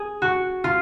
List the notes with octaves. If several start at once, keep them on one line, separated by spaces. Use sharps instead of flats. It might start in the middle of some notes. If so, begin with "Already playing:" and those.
Already playing: G#4
F#4
F4